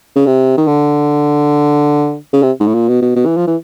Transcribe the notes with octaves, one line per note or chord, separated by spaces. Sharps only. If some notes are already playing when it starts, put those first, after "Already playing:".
C#3
C3
D#3
D3
C#3
C3
G#2
A2
A#2
B2
B2
B2
E3
F3
E3